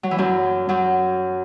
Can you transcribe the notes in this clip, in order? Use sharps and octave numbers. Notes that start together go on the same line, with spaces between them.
F#3
E3
F#2 F#3
F#2 F#3